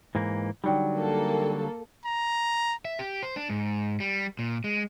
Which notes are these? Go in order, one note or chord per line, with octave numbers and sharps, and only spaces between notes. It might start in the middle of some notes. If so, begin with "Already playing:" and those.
G#2 E3 A#3
D3 F#3 G3 D#4 D5 G5
A#3 A4
A#5
E5
G4
C5
D4
G#2
G3
A#2
G#3